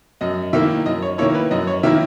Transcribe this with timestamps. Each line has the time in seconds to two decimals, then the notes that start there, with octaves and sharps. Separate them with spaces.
0.21 F#2 D#5
0.53 D#3 A#3 E4 E5
0.86 F#2 D#5
1.02 C#5
1.18 D#3 A#3 E4 C#5
1.35 B4
1.51 F#2 D#5
1.67 C#5
1.83 D#3 A#3 E4 E5